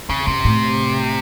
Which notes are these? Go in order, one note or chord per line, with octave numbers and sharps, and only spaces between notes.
F2 C#3
F#2 C3
A2